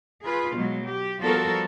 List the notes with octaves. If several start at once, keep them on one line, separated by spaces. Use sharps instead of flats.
F4 G#4 B4
B2 F#3 G#3
G4
F3 G3 B3 F#4 A4 A#4